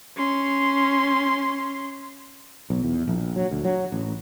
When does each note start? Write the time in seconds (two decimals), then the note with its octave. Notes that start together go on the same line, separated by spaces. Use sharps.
0.17 C#4 C6
2.70 B1
2.83 E2
3.08 A#1
3.36 F#3
3.51 D2
3.65 F#3
3.92 A1